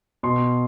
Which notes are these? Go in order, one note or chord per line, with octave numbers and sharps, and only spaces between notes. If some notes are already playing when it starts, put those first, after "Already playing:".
B2 C6